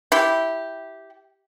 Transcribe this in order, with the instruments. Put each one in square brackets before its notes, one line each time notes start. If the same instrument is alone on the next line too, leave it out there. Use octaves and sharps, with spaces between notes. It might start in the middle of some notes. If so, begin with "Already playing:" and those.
[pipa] E4 G4